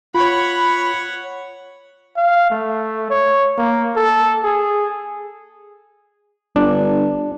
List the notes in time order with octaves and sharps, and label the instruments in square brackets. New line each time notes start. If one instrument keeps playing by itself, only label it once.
[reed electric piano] F4 [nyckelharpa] C#5 F#5 [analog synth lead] B5
[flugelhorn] F5
A3
C#5
A#3
A4
G#4
[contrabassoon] G1 [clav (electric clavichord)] D4